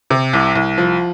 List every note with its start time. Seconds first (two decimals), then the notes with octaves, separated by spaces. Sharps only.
0.10 C3
0.33 C2
0.55 C2
0.78 F3